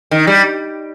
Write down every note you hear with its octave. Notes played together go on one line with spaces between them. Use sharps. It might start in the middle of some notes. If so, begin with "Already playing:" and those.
D#3
G3